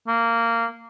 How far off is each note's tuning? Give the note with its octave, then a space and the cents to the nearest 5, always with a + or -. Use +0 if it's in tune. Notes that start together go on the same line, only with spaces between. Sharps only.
A#3 -15